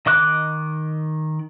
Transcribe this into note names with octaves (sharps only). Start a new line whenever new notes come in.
D#3 D#5 D6 F#6